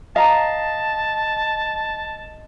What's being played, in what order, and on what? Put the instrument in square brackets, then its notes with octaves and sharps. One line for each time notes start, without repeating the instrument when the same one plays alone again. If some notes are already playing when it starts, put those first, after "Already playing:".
[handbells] D#5 [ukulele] F5 A#5 [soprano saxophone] A5